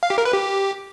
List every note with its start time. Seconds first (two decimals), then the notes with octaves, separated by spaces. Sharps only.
0.03 F5
0.10 G4
0.18 A#4
0.25 B4
0.33 G4